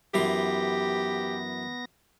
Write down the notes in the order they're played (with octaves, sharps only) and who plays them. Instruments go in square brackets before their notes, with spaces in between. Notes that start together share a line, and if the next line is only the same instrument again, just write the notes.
[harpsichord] F#2 E3 C6 [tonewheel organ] B3 A#6 [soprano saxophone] G4